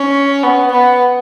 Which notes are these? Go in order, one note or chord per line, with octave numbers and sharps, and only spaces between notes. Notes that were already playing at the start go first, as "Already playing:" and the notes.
Already playing: C#4
B3
B3